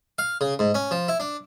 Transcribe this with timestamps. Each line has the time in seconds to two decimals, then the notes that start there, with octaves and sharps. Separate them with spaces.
0.18 F5
0.41 C#3
0.59 G#2
0.74 C#4
0.91 F3
1.08 E4
1.20 D4